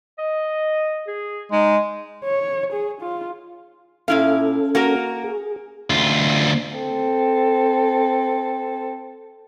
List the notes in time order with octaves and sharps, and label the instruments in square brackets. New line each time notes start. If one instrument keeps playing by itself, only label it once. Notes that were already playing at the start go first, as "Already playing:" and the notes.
[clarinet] D#5
G#4
[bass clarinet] G#3 [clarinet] D#4
[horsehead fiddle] C#5
G#4
F4
[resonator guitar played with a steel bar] A#2 E4 F5 [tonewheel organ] C#4 A4
[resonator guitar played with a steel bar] A#3 F#4 A#4
[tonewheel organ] G#4
[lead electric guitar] D2 F4
[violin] C4 A4